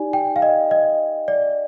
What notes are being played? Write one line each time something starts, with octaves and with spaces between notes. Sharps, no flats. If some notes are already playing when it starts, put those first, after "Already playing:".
Already playing: D#4 G4 D5 G#5
G5
F5
D#5
D#5
D5